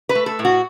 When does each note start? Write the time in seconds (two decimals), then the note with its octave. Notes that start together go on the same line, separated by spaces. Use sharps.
0.09 B4
0.15 A3
0.26 A4
0.39 A2
0.45 F#4